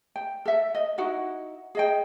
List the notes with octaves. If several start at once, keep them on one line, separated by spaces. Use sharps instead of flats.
G5
A4 E5
D#5
D#4 E4 F#4 F#5
G#4 D#5 G5